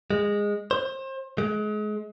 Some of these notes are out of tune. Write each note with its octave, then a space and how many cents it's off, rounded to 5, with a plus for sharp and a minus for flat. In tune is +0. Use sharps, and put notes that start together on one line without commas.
G#3 -15
C5 +30
G#3 +30